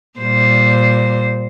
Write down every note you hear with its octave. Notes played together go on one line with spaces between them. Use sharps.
A#2 G3 C5